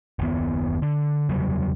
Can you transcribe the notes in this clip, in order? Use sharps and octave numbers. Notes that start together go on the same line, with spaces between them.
F#1 D#2 B3
D3
E2 C#3 F#3 G3